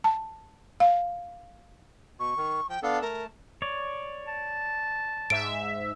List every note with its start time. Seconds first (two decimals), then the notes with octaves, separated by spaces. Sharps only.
0.04 A5
0.80 F5
2.19 B2 C#6
2.37 D#3
2.69 F3 G5
2.83 B3 D4 A4 F5
3.02 A3 A#4 A5
3.62 C#5 D5
4.27 A5
5.30 G#2 E5 D7